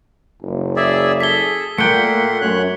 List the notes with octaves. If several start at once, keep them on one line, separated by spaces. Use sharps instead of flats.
F#1
G#4 D5 E5
G#4 A4 B6 G7
A#2 A3 A#3 F#5 G5 C6 C#7 G7
F#2 C#5 F#6